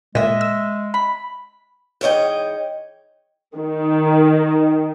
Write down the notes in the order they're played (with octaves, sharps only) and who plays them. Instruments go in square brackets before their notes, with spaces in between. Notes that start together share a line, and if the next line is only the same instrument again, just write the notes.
[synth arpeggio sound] A#2 [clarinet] G#3 [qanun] D#5 E5
[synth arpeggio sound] E6
[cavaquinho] B5
[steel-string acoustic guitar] G#2 E3 C#5 D#5 G5
[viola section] D#3